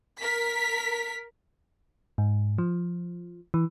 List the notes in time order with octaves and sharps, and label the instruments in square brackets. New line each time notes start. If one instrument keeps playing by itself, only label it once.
[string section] A#4 B6
[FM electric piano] G#2
F3
E3